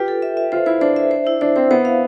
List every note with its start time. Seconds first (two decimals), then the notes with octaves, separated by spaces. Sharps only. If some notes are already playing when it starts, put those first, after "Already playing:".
Already playing: F4 G4 B4
0.08 A4
0.22 E5
0.37 E5
0.52 F4 C5
0.66 E4 C5
0.81 D4 C5
0.96 E5
1.11 C5
1.27 E4
1.41 D4 C5
1.56 C4 C5
1.71 B3 C5
1.85 F5